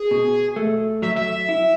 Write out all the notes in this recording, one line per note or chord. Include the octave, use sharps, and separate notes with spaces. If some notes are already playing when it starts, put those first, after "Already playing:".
Already playing: G#4
B2
A3
F#3 E5
E5
E4